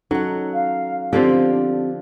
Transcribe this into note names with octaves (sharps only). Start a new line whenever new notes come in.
F#3 C#4 D#4 A4 F#5
F5
D3 F3 C4 D4 G4 C5